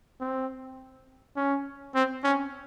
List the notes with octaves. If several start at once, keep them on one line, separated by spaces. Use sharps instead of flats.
C4
C#4
C4
C#4